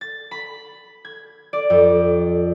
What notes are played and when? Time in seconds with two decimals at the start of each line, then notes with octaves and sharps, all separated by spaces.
0.01 A6
0.31 B5
1.05 G#6
1.53 D5
1.70 F2